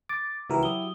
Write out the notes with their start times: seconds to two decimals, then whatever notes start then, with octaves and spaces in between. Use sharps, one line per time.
0.09 D6 A6
0.50 C#2 E3 E4 F#4 G4 A#4 B4
0.63 F#3 D#6 G7